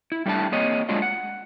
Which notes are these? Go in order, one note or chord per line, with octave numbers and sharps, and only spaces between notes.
E4
G3 A3 D4 E4 A5
A#3 C4 G#4 C#5 D#5
F#3 G#3 A3 D4 F4 D#5
F#5